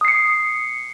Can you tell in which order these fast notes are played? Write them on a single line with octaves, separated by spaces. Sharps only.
D#6 C7 C#7